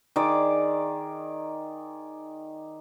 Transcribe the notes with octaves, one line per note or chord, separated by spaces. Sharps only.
D#3 G#4 D5 D6